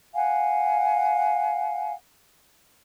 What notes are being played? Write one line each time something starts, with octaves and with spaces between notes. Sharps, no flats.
F5 F#5 G#5